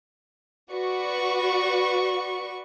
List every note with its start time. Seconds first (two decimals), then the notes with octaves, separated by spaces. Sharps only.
0.72 F#4 B4 D5 C#6